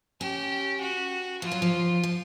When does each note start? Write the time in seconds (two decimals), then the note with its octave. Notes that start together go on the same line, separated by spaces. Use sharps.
0.21 C#4 G4
0.81 F#4
1.42 F3 F4
1.52 F#3
1.62 F3
2.03 F3